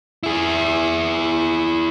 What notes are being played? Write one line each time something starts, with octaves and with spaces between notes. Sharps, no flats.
E4 G#4